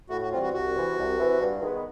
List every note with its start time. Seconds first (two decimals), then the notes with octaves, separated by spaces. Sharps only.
0.10 A2 F#4
0.22 F#4
0.31 E3 G3 C4 F4
0.42 F#4
0.53 C2 F#4
0.75 C3 E3
0.97 C2
1.18 C3 E3
1.40 G2
1.61 D#3 G#3 B3